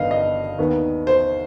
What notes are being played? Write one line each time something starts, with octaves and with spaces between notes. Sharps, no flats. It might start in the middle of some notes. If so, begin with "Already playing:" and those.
Already playing: G1 G2 D#3 B3 D#5 F5
D#5
D#2 D#3 B3
C5